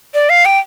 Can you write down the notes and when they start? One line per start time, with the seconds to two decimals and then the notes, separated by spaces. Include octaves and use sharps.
0.14 D5
0.30 F5
0.45 G5